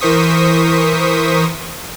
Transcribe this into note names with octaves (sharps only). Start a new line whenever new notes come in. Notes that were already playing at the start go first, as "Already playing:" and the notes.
E3 A#4 C5 C#6 D#6 B6